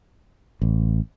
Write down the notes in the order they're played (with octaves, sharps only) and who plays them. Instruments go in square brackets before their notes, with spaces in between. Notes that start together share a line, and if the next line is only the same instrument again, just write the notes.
[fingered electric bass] A1